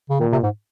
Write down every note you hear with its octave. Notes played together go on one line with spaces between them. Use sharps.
C#3
A#2 D#3
C3
G#2